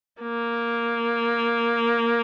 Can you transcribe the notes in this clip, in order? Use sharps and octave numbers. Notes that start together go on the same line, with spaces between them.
A#3